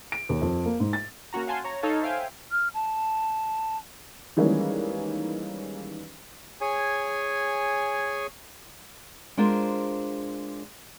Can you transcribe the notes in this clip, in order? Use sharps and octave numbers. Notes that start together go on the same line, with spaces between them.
D7
D#2
F2
A#3
G#2
A6
A#3 C#4 F#4 A#5
F5 F#5 G#5 A5 C6
C#5 A#5
D#4 A4 C#5 F5 A5
C5 E5 F5 G5 G#5
F6
A5
D#3 E3 G3 G#3 A#3 C#4
G#4 C#5 G#5
G#3 D4 F4 A#4 C5